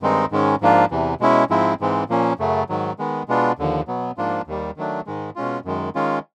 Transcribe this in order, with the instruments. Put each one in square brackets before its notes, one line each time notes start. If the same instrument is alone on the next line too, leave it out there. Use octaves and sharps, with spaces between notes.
[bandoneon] G2 D#3 G#3 C4 D#4
G#2 D#3 G#3 C#4
G#2 F3 A#3 D4 F4
E2 C3 E3
B2 G#3 C#4 E4
G#2 F3 G#3 C4 E4
G#2 E3 G#3 C4
A#2 F3 A#3 C#4
F#2 C#3 F#3 A3
G#2 D#3 F#3
D#3 G#3 B3
B2 G#3 B3 D4 F4
D#2 D3 F3
B2 F#3 B3
G#2 F3 A#3 D4 F4
D#2 D#3 G3
D#3 F#3 A3 D4
G#2 D#3 G#3
B2 G#3 C#4 F4
F#2 D#3 G#3
D#3 G#3 C#4 F4